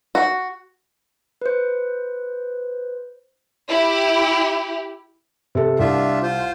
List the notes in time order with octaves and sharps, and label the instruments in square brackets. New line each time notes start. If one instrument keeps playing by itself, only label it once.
[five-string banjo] F#4
[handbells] B4 C5
[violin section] E4 G4
[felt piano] C3 A4
[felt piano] C2 [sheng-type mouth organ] D4 F4 E5
[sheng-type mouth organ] F4 C5